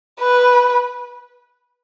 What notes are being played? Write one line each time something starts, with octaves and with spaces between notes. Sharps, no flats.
B4